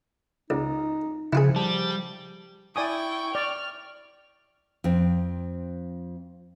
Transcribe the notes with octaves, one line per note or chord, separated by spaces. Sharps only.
C#2 D#4
C#3 F3 E4 F4 G#4
G3 A5
E4 D5 G5 G#5 C#6 D#6
D5 F6
F2 C4